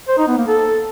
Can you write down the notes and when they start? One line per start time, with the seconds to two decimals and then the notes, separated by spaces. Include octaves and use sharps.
0.08 C5
0.18 D#4
0.28 B3
0.38 A#3
0.47 A4